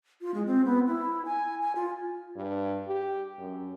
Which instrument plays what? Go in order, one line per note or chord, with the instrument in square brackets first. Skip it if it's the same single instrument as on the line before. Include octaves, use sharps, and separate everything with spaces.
[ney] F4
G#3
C4
B3
E4
G#5
G#5
F4
[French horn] G2
G4
F#2